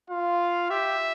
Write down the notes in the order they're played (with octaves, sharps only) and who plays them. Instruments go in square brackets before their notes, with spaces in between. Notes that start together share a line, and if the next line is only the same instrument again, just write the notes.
[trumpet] F4 [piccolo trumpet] F5
[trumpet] G4 [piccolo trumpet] E5